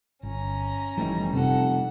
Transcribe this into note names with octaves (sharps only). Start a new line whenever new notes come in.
G1 C#4 A#5
F#1 E3 F3 G3 A3 D#4
F1 C3 A4 F#5